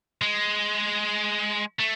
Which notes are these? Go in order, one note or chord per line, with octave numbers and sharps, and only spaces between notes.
G#3
A3